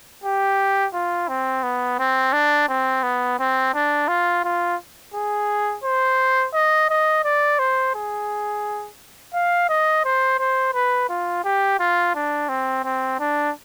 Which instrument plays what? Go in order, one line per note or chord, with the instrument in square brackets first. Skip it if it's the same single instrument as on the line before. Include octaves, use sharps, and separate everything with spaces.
[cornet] G4
F4
C4
B3
C4
D4
C4
B3
C4
D4
F4
F4
G#4
C5
D#5
D#5
D5
C5
G#4
F5
D#5
C5
C5
B4
F4
G4
F4
D4
C4
C4
D4